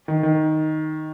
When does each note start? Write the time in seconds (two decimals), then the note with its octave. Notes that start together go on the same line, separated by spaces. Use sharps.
0.08 D#3
0.23 D#3